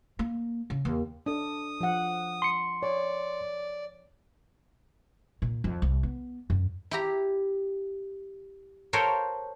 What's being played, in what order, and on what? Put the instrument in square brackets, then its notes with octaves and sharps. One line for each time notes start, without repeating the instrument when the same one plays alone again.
[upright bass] A#3
C#3
D#2
[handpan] D4 A4 [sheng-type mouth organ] D#6
[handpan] F3 F#5
[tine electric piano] C6 C#7
[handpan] C#5 [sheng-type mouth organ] D5
[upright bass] A#2
F2
C2
B3
F#2
[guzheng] E4 G4 A#5
A4 A#4 C5 C#5 F5 G5